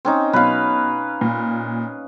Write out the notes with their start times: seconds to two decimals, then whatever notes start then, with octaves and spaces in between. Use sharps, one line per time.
0.05 C4 C#4 D#4
0.33 B2 F#3 B3 B4 F5
1.21 A#2